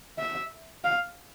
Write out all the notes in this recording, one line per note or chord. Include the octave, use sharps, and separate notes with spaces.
E5
F5